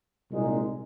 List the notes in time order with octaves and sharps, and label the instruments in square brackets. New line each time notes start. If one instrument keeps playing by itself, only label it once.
[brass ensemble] C2 A#2 G#3 D#4